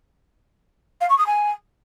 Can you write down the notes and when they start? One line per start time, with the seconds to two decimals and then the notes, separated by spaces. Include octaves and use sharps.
1.01 F5
1.09 C#6
1.18 D#6
1.27 G#5